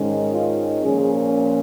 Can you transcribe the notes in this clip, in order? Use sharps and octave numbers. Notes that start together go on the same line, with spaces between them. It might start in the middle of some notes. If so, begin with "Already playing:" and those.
Already playing: G#2 D#3 G#3 C#4
F4
A#2 F3 C#4 G#4